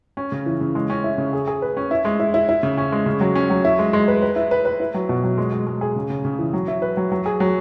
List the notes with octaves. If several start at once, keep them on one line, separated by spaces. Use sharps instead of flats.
C#4
C#3
E3
C#3
G#3
C#4
E4
C#3
G#4
G#4
B4
C#4
E4
G#3
E4
E4
E4
C#3
C#4
G#3
C#3
F#3
C#4
F#3
E4
G#3
G#3
B4
B4
E4
B4
B4
E4
F#3
B2
F#3
G#3
G#3
G#3
G#4
C#3
C#3
C#3
E3
F#3
E4
B4
F#3
F#3
G#4
F#3